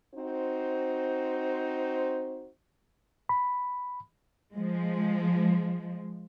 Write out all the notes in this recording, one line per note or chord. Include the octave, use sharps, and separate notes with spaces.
C4 D#4 F#4 C5
B5
F3 G#3